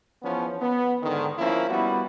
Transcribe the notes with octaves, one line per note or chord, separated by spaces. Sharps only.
E2 F3 B3 C#4
B3
G#2 D3 D#3
F3 A#3 C#4 E4
G3 B3 E4 F#4